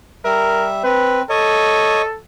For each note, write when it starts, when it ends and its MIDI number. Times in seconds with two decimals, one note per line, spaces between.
0.25 0.83 55
0.25 0.67 70
0.25 0.83 76
0.84 1.23 60
0.84 1.21 71
1.30 2.18 69
1.30 2.02 73
1.30 2.02 75